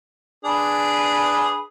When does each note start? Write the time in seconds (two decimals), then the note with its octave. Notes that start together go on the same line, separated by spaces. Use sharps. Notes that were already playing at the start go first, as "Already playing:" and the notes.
0.45 D4 G#4 B4